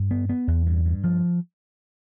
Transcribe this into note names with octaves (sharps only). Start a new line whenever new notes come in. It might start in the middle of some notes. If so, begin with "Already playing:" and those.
Already playing: G2
B3
B3
E2
G2
G2
F3